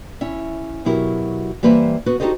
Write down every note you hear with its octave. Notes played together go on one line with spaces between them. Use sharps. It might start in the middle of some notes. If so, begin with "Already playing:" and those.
C#4 E4 E5
B2 F#3 E4 G4 A#4
E3 G3 A#3 B4 C5 E5
B3 F#4 B4
D#4 F#4 G4 A4 C5 D#5